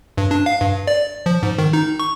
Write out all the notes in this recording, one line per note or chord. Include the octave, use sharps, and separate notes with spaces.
G2
D4
F5
G2
D5
F3
G#2
D#3
D#4
C#6